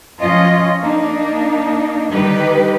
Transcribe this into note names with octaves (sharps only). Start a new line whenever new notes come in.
F3 C#4 F4 D#5
A#3 D4 D#4
D3 D#3 G3 D#4 G4 B4